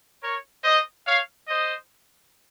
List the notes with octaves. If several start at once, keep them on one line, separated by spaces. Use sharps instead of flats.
A#4 C#5
C5 D#5
C#5 F5
C5 D#5